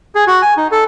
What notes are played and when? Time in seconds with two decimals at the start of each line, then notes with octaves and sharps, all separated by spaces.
0.15 G#4
0.27 F#4
0.42 G#5
0.57 D#4
0.72 A4